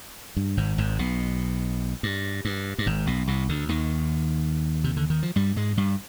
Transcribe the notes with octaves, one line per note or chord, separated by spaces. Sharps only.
G2
G#1 G#2
G#1 G#2
B1 B2
G2
G2
G2
G#1 G#2
B1 B2
C2 C3
D2 D3
D#2 D#3
C3
D3
D#3
F3
G2 G3
G#2 G#3
G2 G3